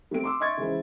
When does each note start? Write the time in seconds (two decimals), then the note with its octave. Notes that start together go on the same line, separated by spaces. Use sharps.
0.11 G3 A3 C4 D7
0.24 C6 D6 E6
0.40 D#5 E5 C6 C#6 G#6 A6
0.57 C#3 E3 G#3 E4 C5